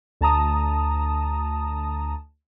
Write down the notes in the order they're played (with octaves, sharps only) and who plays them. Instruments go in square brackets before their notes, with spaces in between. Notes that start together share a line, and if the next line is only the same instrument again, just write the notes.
[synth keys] D2 A5 A#5 D#6